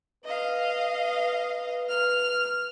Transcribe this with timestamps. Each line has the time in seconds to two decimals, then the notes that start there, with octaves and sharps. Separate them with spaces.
0.25 B4 D#5 F5
1.89 F6